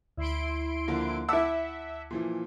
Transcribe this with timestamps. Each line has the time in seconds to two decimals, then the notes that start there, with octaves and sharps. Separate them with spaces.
0.17 D2 E4 C6 D7
0.88 D3 F3 A#3
1.29 E4 E5 F#5 A5 D6 E6
2.11 A#2 E3 F3